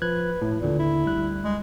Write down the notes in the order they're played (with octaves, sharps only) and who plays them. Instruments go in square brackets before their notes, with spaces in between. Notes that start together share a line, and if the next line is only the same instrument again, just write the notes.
[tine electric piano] F3 F#6 G#6 [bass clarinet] B4
[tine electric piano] A2
[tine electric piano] D#2 D3 [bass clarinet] A#2
[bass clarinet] E4
[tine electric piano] D2 G3 F#6
[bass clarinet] G#3